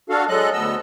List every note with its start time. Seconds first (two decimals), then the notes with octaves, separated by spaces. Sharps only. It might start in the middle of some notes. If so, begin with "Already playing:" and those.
0.10 D4 F#4 A4 F5
0.28 F#3 G#3 A4 D#5 F#6
0.53 D2 B3 D#5 E6